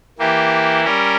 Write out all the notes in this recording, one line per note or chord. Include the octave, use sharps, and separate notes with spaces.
E3 A#3 E4 G4
G3 C#4 G4 A#4